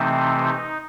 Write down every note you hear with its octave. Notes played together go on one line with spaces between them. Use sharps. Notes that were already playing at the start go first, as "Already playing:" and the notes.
Already playing: C3 E3 A3 C4 D#4